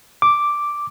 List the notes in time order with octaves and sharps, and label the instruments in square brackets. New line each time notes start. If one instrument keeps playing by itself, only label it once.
[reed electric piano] D6